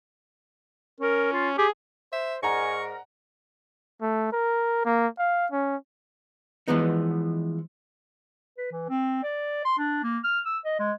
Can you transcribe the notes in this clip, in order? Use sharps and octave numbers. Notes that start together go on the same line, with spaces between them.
C#4 A#4
F4
G4 G#4
C5 E5
G#2 A#4 D5 F#5 G#5 A#5 C#6
A3
A#4
A#3
F5
C#4
E3 F3 G#3 B3 D#4
B4
E3
C4
D5
C6
D4
A#3
F6
E6
D#5
G#3